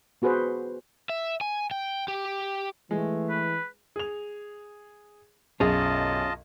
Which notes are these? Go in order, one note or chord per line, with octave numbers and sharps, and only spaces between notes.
B3 F#4 G#4 B4 C5
E5
G#5
G5
G4
E3 G#3 A3
B4
G#4 F7
B1 F#2 C#4 F4 G#4 D#5 A5